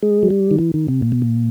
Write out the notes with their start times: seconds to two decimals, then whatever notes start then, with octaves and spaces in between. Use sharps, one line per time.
0.02 G#3
0.23 F#3
0.30 G3
0.51 D#3
0.59 E3
0.74 D#3
0.88 C3
1.02 A#2
1.12 B2
1.22 A#2